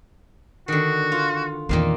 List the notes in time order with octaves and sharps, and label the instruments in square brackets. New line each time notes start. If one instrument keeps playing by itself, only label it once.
[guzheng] D3 D#3 [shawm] F#4
[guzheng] F4
[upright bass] E2 C4 [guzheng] A#2 D#3 A#3